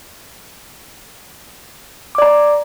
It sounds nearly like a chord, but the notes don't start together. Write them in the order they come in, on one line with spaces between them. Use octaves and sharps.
D6 D5 A#5